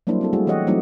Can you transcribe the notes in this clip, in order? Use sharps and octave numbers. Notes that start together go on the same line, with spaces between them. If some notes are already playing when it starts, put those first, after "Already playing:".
F#3 G3 A#3 D4 E4 C5
C4 E4 A4
G3 A3 E4 F#4 G#4
E3 G4 C#5 D#5 F#5
F#3 A3 C4 D#4 E4 F#4